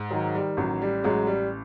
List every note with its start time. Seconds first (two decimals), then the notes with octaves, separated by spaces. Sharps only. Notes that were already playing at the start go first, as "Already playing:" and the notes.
Already playing: G#2
0.11 D#3 F#3
0.35 G3
0.57 A1 F#3
0.82 G3
1.04 A1 F#3 G#3
1.27 G3